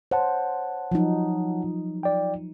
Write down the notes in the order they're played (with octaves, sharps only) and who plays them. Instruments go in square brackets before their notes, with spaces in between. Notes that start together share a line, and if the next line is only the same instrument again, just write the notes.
[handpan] C5 [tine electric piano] C#5 F#5 A5
[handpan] F3 F#3 D#4
[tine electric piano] D5 G5